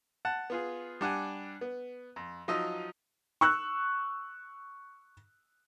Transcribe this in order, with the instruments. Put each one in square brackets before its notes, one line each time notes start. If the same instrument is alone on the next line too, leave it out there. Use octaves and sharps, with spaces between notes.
[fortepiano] F#5 A5
B3 F4 G#4
G3 D4 F#5 G#5
B3
F2
F3 F#3 D#4 F4 D#5 E6
[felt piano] C#6 E6 F#6